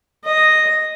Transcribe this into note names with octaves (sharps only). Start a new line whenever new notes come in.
D#5